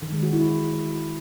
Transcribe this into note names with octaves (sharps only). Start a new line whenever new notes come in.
D#3
G#3
F#4
E4